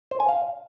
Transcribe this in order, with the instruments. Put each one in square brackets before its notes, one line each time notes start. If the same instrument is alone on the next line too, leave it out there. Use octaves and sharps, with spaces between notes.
[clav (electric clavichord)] C5
G#5
F5